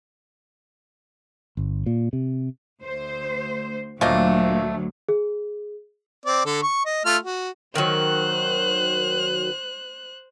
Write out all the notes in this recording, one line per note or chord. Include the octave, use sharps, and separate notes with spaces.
G1
A#2
C3
D2 C5
D2 A#2 F#3 A3 A#3 C5 D#5 F5
G#4
C4 D5
D3 A4
C#6
D#5
A3 F4 F6
F#4
D#3 F#3 C5 F#6